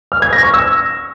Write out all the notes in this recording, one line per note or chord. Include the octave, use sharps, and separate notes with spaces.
F6
G#6
A#6
C#6
E6